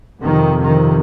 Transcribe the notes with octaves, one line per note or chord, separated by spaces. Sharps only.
F2 C3 D#3
D#3